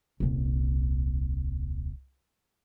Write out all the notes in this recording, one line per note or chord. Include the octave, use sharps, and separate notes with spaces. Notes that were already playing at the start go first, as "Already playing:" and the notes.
D#1 C2